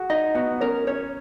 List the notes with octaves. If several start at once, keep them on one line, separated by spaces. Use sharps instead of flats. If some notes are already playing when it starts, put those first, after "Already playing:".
Already playing: F#4 G#4
D#4 D#5
B3 F#4
C#4 A#4
C#4 C#5